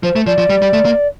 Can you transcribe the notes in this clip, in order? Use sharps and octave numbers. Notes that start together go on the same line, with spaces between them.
F3 C5
A3
F3 D5
F3
G3
G3
A3
A#3